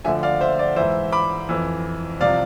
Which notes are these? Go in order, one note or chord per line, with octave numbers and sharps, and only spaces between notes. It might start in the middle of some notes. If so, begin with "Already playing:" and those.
D2 D3 F3 E5 G#5
D5 F5
C5 E5
D5
G#2 E3 C5 E5
B5 D6
F2 E3
C2 C3 F3 D5 F5